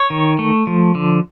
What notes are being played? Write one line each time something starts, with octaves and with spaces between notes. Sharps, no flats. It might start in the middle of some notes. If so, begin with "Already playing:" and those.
Already playing: C#5
D#3
A3
F3
D3